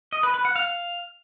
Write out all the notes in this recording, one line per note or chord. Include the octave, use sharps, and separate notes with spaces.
D#5
B4
B4
F#5
F5